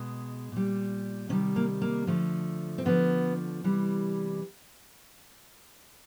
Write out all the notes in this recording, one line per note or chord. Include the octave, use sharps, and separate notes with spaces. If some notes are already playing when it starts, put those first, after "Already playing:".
Already playing: B2 G#3
A#2 G3
C3 D#3 G3 C#4
A#3
A#3
D3 F3 A3
C4
D3 F3 A3 B3
C3 E3 G3